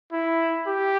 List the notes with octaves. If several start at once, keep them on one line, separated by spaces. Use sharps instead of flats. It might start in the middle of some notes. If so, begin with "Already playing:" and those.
E4
G4